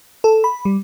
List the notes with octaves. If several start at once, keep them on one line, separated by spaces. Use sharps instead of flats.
A4
B5
G3